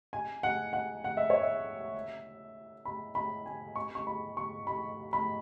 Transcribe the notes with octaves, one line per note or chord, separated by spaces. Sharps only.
G#5
F#5
F#5
F#5
E5
C#5
E5
B5
B5
G#5
C#6
C#6
B5
C#6
B5
B5